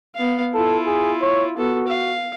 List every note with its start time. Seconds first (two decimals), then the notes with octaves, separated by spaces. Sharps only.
0.15 B3 F5
0.54 E4 F4 A4
0.86 G#4
1.22 C#5
1.57 B3 F#4 A4
1.88 F5